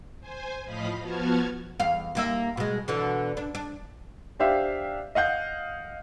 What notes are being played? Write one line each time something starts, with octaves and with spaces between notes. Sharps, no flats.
C5 G#5
A2 F3 D#5 F5 B5 B6
F3 B3 F#4 A5 F6 G#6
E2 F5
D#2 A#3 E5
B2 G#3
B2 D3 E3
D4
D4
D4 G4 C5 E5 F5
D#5 F5 F#5 G6